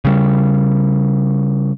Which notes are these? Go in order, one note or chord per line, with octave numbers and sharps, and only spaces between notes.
C#3 G3